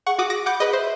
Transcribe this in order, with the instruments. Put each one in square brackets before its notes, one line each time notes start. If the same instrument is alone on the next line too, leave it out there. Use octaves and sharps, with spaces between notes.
[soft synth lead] G#4 [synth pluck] F#5 C#6
[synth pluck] F#4 D6 D#6
D6 A#6 D7
[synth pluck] F#5 D6 G6 [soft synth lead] B5
[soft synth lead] G#4 [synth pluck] B4 D#5
[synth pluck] C5 [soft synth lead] E5